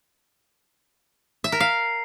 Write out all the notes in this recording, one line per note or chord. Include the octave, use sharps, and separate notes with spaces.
E5
A#4
F5